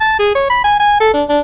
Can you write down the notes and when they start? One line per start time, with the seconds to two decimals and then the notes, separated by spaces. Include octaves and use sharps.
0.01 A5
0.19 G#4
0.35 C#5
0.50 B5
0.64 G#5
0.80 G#5
1.00 A4
1.14 D4
1.29 D4